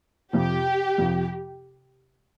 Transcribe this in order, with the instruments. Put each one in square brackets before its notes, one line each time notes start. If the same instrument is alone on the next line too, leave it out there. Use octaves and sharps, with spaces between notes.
[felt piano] F2 C3 F3 [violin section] G4
[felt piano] F2 C3 F3